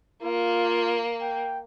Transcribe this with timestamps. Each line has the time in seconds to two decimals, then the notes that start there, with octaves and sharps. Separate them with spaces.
0.23 A#3 F4
1.21 G5